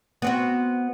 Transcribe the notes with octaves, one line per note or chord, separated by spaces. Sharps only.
B3 C4 F#4